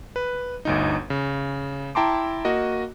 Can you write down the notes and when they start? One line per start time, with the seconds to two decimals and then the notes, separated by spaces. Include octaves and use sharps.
0.16 B4
0.65 G1 D2 D#4
1.10 C#3
1.95 E4 G5 A5 A#5 C6 D6
2.45 A#3 F#4 D#5